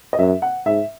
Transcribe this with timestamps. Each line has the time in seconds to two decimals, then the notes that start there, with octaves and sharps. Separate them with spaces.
0.13 D#5
0.19 F#2 E5
0.42 F#5
0.66 G#2 E5